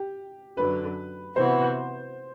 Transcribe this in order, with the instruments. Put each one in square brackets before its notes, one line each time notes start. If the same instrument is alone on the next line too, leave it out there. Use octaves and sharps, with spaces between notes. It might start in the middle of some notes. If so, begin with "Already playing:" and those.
Already playing: [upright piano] G4
[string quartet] F#2 D3 F#3 [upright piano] B4
[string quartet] C3 E3 B3 F#4 [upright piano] C5